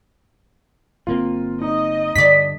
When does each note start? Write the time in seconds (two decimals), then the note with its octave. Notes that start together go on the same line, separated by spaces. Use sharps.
1.07 G1 A#3 C4 F4
1.62 D#4 D#5
2.16 G2 D3 D5 B6